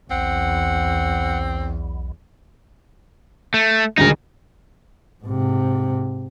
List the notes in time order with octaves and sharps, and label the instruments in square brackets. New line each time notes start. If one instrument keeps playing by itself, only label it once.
[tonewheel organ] B1 [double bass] E2 [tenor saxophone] C4 [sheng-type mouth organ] F#5
[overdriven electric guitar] A3
[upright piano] D#1 D2 G#3 [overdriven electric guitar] D#4 A#4
[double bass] G#2 C3